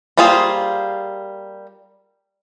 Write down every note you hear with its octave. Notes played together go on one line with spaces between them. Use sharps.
G3 A#3 F4 G#4 C5